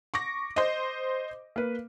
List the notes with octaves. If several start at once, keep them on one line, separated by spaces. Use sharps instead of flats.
C#6 D6 A#6
C5 D#5
A#3 B4